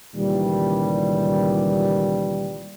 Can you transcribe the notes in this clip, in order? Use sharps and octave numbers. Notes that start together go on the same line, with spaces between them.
C#2 A#2 D#3 E3 G3